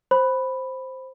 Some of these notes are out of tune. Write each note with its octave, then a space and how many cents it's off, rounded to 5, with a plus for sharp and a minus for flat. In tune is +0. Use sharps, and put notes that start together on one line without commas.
C5 +0 B5 +0